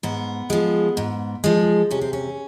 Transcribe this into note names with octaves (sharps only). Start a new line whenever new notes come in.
G#2 B3
F3 G#3
G#2
F3 G#3
C3 C#4
C4
C#4